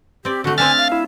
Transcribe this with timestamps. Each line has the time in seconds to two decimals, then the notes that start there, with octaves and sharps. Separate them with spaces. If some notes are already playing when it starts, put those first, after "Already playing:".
0.25 C4 G4 D5
0.44 D3 A3 F#4
0.58 C4 D4 E5 G#5 F6 A6
0.78 F5
0.92 E4